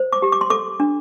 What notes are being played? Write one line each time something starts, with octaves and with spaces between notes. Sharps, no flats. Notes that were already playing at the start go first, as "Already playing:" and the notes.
Already playing: C5
D6
G4
D6
C6
A4 D6
D4